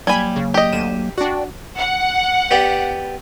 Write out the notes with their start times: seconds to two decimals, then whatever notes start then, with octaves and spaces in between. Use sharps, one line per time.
0.07 F#3 G3 A#3 G#5 B5 G#6
0.36 C#3
0.54 G4 D#5
0.73 D2 D#7 E7
1.18 D4 F#4 D5 G5
1.77 F#5
2.51 B3 G4 D5